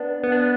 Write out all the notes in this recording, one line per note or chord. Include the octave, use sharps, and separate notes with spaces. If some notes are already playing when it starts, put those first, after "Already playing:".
Already playing: B3 D4
B3
D4
B3